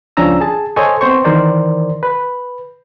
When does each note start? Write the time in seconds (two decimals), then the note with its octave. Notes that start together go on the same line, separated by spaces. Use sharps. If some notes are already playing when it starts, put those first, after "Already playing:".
0.17 C#2 F3 C#4 D4 A#5 E6
0.41 G#4 A5
0.76 A4 C5 C#5 D#5 G#5
1.01 B3 C4 C5 C#6
1.24 D#3 E3 A#4 C5 D5
2.03 B4